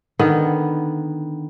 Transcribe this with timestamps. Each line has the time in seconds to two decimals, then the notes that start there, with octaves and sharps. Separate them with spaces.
0.19 D3 D#3 B3